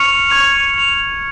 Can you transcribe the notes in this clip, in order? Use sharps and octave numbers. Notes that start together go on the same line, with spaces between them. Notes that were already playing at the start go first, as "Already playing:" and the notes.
Already playing: C#6 F6 C#7 F7
C#6 G#6 F7
C#6 G#6 F7